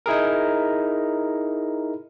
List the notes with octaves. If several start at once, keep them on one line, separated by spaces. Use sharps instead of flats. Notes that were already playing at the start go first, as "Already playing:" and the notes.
D#4 E4 G#4 A#4